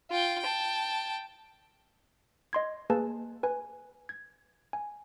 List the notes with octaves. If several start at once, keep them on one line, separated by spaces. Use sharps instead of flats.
F4 G5
G5 A5
D#5 C6 G#6
A#3 G#4 B4 G#5 A5
B4 G#5
G#6
G#5